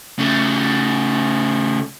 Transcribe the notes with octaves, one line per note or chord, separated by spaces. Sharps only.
C#3 A3